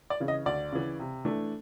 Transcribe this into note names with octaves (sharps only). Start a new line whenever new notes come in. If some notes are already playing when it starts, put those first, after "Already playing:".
D5
C#3 E3
D#5
D2 D5
C#3 E3
C3
E3 A3 D4